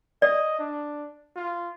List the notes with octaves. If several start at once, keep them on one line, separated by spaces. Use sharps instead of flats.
D5 D#5
D4
F4